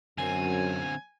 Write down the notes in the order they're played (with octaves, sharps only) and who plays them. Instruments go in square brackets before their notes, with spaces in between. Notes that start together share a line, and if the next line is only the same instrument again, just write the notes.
[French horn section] F#2 [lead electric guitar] D3 C4 [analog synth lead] G#5